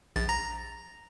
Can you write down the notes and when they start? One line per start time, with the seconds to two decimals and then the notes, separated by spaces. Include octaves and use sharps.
0.16 A#1 A6
0.29 A#5 A#6